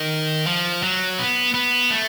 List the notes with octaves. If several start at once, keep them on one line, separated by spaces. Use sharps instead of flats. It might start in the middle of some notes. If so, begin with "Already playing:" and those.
Already playing: D#3
F3
F#3
B3
B3
A3